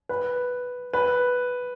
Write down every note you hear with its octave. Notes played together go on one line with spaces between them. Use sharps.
B4
B4